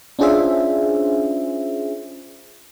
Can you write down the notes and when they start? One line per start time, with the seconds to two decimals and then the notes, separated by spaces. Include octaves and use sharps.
0.19 C#4 D4 F4 G#4 C5 E5